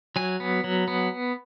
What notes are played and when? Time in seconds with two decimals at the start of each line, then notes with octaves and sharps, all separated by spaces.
0.16 F#3 G#5
0.40 B3
0.64 F#3
0.88 B3